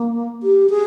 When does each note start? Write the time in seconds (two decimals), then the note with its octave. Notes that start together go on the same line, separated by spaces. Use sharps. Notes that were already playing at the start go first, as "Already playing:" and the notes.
Already playing: A#3
0.43 G4
0.70 G#4